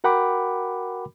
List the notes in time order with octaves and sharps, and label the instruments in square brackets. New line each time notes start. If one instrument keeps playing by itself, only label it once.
[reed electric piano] F#4 A#4 F#5 G5 B5 D6